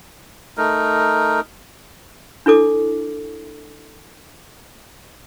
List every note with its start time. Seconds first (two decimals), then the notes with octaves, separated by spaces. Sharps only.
0.58 A3 D#4 A#4
2.46 D4 E4 A4 D6